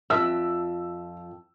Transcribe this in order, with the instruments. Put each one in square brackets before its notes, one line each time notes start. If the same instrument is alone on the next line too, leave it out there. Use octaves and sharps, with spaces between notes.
[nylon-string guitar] F2 E5 [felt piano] E6